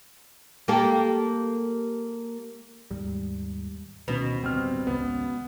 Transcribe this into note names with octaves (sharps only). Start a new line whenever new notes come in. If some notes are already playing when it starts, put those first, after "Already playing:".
A#3 G4 A4
D#2 G#2 G3
D2 B2 D#3 C#4
D1 G2 B3 C4 F6
G#1 C#2 C#3 B3